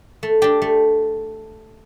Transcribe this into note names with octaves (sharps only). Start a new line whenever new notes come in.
A3
D4 G4 D5
A3